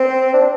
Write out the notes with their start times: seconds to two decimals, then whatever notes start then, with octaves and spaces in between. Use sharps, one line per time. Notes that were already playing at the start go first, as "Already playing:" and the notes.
Already playing: C4
0.34 D4
0.42 C4